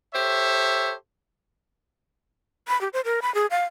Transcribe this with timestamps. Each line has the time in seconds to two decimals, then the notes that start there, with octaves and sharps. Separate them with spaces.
0.14 G4 A4 C5 C#5 E5
2.68 B5
2.81 G4
2.93 C5
3.05 A#4
3.22 B5
3.35 G#4
3.51 F5